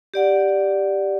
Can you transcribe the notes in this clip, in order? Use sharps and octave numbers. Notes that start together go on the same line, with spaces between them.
G4 D5 F#5